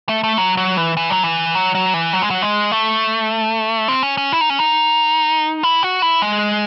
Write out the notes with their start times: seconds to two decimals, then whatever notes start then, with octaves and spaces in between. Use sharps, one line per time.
0.09 A3
0.24 A3
0.38 F#3
0.57 F#3
0.77 E3
0.97 E3
1.10 F#3
1.23 E3
1.55 F#3
1.75 F#3
1.94 E3
2.13 F#3
2.22 G#3
2.30 F#3
2.42 G#3
2.72 A3
3.88 C4
4.03 C#4
4.17 C#4
4.32 E4
4.41 D#4
4.50 C#4
4.59 D#4
5.63 E4
5.83 F#4
6.02 E4
6.22 G#3